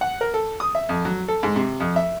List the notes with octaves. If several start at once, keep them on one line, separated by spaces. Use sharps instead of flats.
F#5
A#4
A4
D#6
E5
F2
F#3
A4
G#2
C3
F2
E5